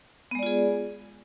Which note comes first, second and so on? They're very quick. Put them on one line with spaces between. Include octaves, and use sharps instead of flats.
B3 G#3 D5 F4 G#4